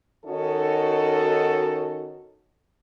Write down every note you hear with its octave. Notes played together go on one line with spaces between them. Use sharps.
D#3 C#4 D#4 F#4 A4